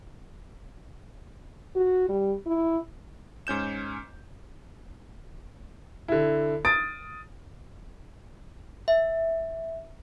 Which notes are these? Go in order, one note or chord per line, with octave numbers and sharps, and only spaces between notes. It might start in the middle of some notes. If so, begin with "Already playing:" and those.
F#4
G3
E4
G#2 C#4 G6 E7
D3 E4
D#6 A6 D7
E5